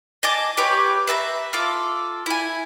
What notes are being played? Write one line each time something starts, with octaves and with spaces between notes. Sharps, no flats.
D#5 G#5 A5 D6
G4 B4 C#5 D6
B4 E5 A5 A#5
F4 A4 D6
E4 G#5